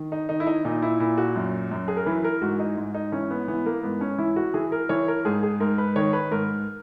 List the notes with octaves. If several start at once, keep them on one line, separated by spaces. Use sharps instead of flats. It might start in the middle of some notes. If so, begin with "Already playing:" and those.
Already playing: D#3
D#4
D#3 D#4
E4
D#4
A#2 D#4
E4
A#2 E4
F#4
F#2
F#2
G#4
A#4
E3 B4
A#4
G#2 F#4
D#4
G#2
D#4
E3 C#4
B3
E3 B3
A#3
G#2 B3
C#4
E3 E4
F#4
E3 G#4
A#4
E3 C#5
A#4
G#2 G#4
G#4
G#2 A#4
B4
D#3 C#5
B4
G#2 A#4